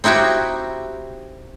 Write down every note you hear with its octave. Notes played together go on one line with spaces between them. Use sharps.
C4 D#4 E4 F#4 G4